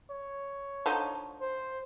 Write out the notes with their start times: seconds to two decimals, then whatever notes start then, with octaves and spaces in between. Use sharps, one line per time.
0.11 C#5
0.86 D3 F3 D#4
1.41 C5